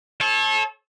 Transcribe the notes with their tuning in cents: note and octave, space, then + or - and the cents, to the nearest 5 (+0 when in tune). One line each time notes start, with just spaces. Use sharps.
A4 -25 C#5 -35